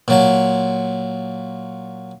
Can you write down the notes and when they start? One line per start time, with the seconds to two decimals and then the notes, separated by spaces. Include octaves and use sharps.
0.08 A#2 F#3 A5